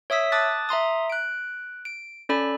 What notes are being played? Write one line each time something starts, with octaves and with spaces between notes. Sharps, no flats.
C#5 E5 D#6 E6 B6
A5 D6 D#6 F#6 A6
E5 A#5 C6 D#6
F#6 D7
D7
C#4 A4 D5 B5